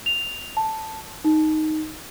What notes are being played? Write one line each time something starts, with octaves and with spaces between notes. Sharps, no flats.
F7
A5
D#4